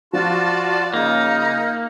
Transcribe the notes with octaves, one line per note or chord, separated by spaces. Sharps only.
F3 F4 F#4 D5 A5
C#3 A#3 D#4